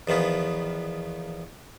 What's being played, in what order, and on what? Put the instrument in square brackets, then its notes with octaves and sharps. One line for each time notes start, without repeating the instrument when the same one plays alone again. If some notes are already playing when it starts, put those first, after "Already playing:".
[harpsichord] E2 D#3 F3 B3